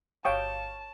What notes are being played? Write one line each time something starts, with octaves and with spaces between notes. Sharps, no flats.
G1 C#5 F5 G5 A5 C#6 D#6